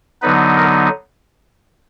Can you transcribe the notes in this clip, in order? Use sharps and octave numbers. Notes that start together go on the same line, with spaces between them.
D3 F#3 B3 D#4 B4
A#4